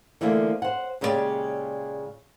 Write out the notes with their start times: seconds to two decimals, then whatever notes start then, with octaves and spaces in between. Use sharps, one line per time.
0.21 D3 E3 F3 A3 A#3
0.62 C5 F#5
1.01 A#2 C#3 G#3 E4 G4 D5